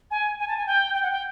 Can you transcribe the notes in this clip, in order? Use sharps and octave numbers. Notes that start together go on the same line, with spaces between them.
G#5
G#5
A5
G#5
G5
G5
F#5
G5